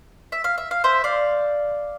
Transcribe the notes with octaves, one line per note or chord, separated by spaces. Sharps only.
E5
F5
E5
F5
C5 E5
D5 F5